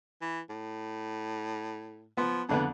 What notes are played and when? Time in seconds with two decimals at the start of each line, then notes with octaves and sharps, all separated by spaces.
0.22 E3
0.50 A2
2.17 F3 B3
2.49 F2 A2 D3 B3